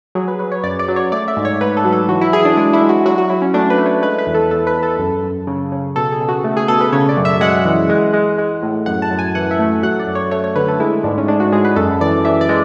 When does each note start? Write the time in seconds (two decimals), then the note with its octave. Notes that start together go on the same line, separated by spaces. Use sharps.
0.15 F#3 G#4
0.28 B4
0.39 F#3 B4
0.52 C#5
0.64 F#2 D5
0.79 D5
0.88 F#3
0.96 C#5
1.12 A3 D5
1.28 E5
1.37 G#2
1.45 C#5
1.61 G#2 B4
1.77 A4
1.84 F#3
1.93 A4
2.09 E3 F#4
2.21 E4
2.33 E3 G#4
2.45 D4
2.57 G#3 D4
2.73 E4
2.82 G#3
2.89 F#4
3.05 F#3 F#4
3.18 F#4
3.30 F#3 E4
3.42 C#4
3.54 A3 D4
3.70 B4
3.78 A3
3.86 C#5
4.02 G#3 B4
4.19 B4
4.27 E2
4.34 A4
4.50 E2 A4
4.67 B4
4.75 E2
4.83 A4
4.99 F#2
5.23 F#2
5.47 C#3
5.72 C#3
5.96 B2 A4
6.12 G#4
6.20 B2
6.28 F#4
6.44 A3
6.57 G#4
6.68 B2 A4
6.81 B4
6.92 C#3 C#5
7.09 D5
7.17 F#2
7.25 E5
7.41 G#3 F#5
7.65 E3
7.89 G#3
8.13 G#3
8.38 G#3
8.63 A2
8.86 F#2 F#5
9.02 A5
9.11 F#2
9.19 G#5
9.35 E3 F#5
9.51 E5
9.59 A3
9.83 F#3 F#5
10.00 D5
10.07 F#2
10.15 C#5
10.31 A3 C#5
10.44 C#5
10.56 D3 B4
10.68 A4
10.80 G#3 E4
11.04 G#2 D4
11.18 C#4
11.28 G#3 D4
11.40 F#4
11.52 G#3 G#4
11.65 B4
11.76 F#2 A4
12.01 E3 D5
12.25 E3 E5
12.41 D5
12.49 G#3